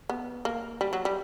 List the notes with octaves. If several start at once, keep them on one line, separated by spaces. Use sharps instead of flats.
B3
A#3
G3
F#3
G3